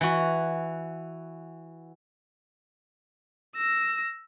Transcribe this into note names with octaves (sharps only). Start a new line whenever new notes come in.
E3 F#4
E6 A#6